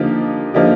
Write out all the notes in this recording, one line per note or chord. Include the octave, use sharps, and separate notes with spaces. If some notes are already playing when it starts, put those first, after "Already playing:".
Already playing: D3 F3 A#3 D#4 G4
D3 F3 A#3 D#4 G4